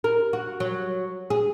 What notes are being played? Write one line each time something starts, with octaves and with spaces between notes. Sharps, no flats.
A#4
F#4
F#3
G#4